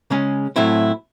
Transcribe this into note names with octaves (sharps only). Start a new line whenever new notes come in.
C#3 G#3 C#4
A2 F#3 A3 C4 E4